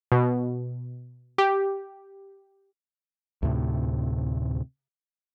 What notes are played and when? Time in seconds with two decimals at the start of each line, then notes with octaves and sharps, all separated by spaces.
0.12 B2
1.38 G4
3.42 D2 A2 C3